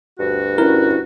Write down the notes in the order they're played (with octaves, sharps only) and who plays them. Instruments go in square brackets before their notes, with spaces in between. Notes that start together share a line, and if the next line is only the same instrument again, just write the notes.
[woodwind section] D2 G2 F#4
[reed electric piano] C#4 E4 [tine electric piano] A#4